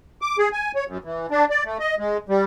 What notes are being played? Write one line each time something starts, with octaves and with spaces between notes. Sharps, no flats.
D6
G#4
G#5
C#5
F#2
E3
D4
D5
A3
D#5
G#3
G3